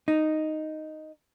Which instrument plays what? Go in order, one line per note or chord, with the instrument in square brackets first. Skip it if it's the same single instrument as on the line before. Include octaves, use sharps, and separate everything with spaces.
[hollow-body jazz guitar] D#4